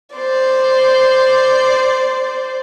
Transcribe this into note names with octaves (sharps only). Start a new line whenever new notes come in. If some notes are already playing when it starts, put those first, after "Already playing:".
C5 D5